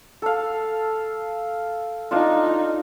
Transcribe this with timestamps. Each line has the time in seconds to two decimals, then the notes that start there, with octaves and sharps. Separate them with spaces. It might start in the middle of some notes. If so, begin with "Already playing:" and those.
0.22 A4 F5
2.11 D4 D#4 F4